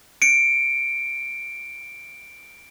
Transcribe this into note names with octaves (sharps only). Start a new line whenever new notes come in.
C#7 D7